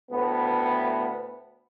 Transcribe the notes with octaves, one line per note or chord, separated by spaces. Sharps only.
D2 A2 B3